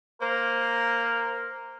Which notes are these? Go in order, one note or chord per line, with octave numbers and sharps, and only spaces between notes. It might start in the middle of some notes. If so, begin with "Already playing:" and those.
A#3 A#4 C5